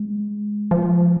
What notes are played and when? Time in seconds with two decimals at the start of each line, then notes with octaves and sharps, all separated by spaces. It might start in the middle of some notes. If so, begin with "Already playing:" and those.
Already playing: G#3
0.71 F3